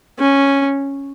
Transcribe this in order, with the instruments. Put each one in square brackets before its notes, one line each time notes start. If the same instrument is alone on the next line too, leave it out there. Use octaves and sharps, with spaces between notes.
[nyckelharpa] C#4